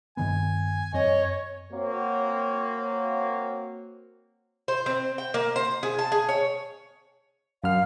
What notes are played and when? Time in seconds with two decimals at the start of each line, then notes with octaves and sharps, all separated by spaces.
0.17 G2 D#3 B3 G#5
0.94 F#2 C4 C#5 D#5
1.72 A#3 C4 F#4 C#5
4.68 C5
4.86 C4
5.18 G5
5.34 A#3
5.56 C5
5.83 G#4
5.99 A5
6.12 G#4
6.29 C#5
7.64 F#2 F5 F6